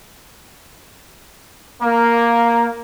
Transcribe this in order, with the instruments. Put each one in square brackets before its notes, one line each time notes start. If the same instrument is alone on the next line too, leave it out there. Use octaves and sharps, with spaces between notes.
[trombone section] A#3